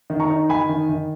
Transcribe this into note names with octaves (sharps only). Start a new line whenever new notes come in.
D#3
A#5 C#6
D#4
D#3 G#5 B5
D#3
D#3